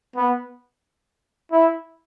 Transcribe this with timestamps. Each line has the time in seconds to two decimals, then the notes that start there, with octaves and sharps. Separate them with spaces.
0.16 B3
1.52 E4